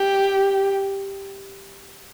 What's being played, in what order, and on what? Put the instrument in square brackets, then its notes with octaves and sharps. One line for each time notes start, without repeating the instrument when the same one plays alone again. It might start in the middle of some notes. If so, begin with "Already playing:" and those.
Already playing: [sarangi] G4